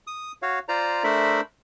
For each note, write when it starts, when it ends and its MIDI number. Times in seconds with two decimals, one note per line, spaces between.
0.07 0.32 87
0.42 0.59 66
0.42 0.59 73
0.42 0.59 77
0.69 1.03 65
0.69 1.03 72
0.69 1.03 74
0.69 1.03 82
1.04 1.41 57
1.04 1.41 62
1.04 1.41 70
1.04 1.41 72
1.04 1.41 76
1.04 1.41 83